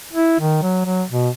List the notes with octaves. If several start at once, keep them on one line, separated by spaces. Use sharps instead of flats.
E4
D#3
F#3
F#3
B2